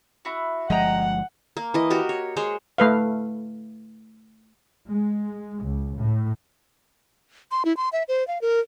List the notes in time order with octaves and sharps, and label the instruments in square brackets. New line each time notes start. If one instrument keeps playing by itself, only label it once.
[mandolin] E4 F#4
[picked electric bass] G1 F3 G#3 [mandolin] D#5 G5 A#5 [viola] F#5
[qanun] A#3
E3 D#5
F#4 G4 A#4
C#5
G#3 C5 C#5
[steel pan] A3 B4 F5
[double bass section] G#3
C#2
A2
[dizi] C6
E4
C6
E5
C5
F5
A#4